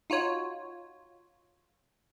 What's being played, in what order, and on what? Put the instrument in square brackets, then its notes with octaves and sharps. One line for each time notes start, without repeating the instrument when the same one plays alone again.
[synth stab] D#4 F4 F#4 C#5